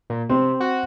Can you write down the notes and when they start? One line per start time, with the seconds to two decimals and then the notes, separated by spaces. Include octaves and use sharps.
0.10 A#2
0.30 C3 C4
0.60 F#4